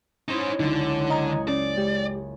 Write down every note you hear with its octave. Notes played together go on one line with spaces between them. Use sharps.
C#4 D#4 E4 C5
F#1 C#2 D3 D#4
D#5 F#5 G#5 A#5 D#6
C#4 D5
G#3 G4